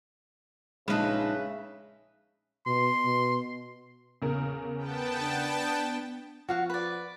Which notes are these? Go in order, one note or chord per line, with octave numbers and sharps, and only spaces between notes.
A#1 C#3 G#3 D#4 B4 D#5 E5 A5
B2 C6
B2
E2 C#3 A#4
B3 G5 A5
D4
F3 F#4 F5 F#5
B4 D5